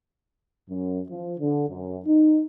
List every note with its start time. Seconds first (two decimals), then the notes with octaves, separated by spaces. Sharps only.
0.70 F#2
1.09 F3
1.39 D3
1.69 F#2
2.06 D#4